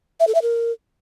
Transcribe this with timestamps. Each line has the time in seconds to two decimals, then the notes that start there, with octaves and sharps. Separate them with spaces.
0.20 E5
0.27 A4
0.35 E5
0.42 A#4